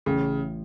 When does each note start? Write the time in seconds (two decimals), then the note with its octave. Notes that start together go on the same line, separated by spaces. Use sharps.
0.06 A1 C#3